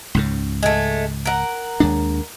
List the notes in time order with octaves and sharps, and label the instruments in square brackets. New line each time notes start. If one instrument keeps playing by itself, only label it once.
[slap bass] C#2 G#2 C#3
[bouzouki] G#3 A3
A#4 F#5
[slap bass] D#2 G#3 D4